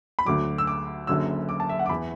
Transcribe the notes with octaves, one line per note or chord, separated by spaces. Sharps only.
B5
D2 D3 F#3 D6
E6
D6
F#1 F#2 D3 F#3 E6
D6
A5
E5
F#5
D6
E2 E3 B5